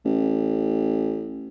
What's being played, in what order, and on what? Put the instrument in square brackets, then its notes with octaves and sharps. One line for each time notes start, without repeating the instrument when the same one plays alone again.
[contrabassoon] A1